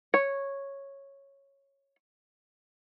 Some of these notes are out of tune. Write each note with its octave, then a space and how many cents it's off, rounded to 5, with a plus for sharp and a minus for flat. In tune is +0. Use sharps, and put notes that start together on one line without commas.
C#5 -5